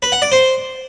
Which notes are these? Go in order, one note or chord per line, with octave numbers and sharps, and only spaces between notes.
B4
F#5
D5
C5